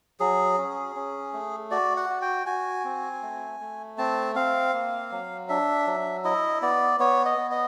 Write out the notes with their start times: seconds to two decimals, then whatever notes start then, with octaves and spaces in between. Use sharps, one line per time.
0.20 F#3 G#4
0.58 C#4
0.96 C#4
1.33 A3
1.71 F#4 D5
1.97 F#5
2.10 F#4
2.22 G5
2.46 F#4 G#5
2.84 C4
3.22 A3
3.60 A3
3.98 C4 A5
4.35 C4 F5
4.73 A#3
5.12 F#3
5.49 D4 E5
5.87 F#3
6.24 E4 D#5
6.62 B3 D5
7.00 B3 C#5
7.26 D#5
7.38 B3
7.51 D#5